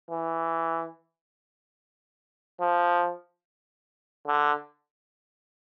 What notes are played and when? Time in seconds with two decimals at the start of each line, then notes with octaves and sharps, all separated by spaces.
0.11 E3
2.61 F3
4.27 D3